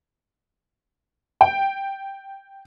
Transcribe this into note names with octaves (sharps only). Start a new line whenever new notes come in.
G5